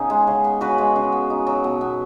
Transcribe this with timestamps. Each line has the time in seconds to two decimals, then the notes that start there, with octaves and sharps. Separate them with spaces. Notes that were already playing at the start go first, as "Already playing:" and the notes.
Already playing: C#3 B3 D#4 G#4
0.10 G#3
0.27 C#3
0.44 B3
0.61 C#3 F#4 B4
0.78 G#3
0.96 C#3
1.12 B3
1.30 D#4
1.47 F#3
1.64 B2
1.81 B3